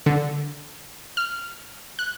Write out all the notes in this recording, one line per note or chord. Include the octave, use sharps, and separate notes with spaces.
D3
F6
F#6